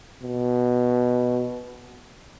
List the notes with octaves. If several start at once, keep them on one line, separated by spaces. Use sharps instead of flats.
B2